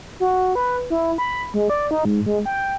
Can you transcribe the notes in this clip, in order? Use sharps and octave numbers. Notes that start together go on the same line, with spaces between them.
F#4
B4
E4
B5
G#3
D5
D#4
G#2
G#3
G5